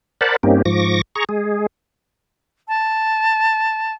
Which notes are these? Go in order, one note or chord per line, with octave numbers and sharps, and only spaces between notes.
A#4 C5 D5 F#5 A5 B5
G2 A#3 C4 C#4 D#4 G4
G#2 F3 C#6 D6 A#6
G#4 A#5 C#6
G#3 G#4
A5